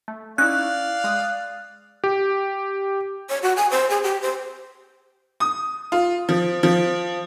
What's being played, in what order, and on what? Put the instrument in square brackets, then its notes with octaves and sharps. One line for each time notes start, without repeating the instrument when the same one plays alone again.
[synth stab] A3
[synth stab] C#4 D#4 E4 [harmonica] D5 F5 [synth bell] F#6
[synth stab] G#3 D#6
[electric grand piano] G4
[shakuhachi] C#5
F#4
G#5
C5
G#4
G4
C5
[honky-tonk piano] D#6
F4
F3
F3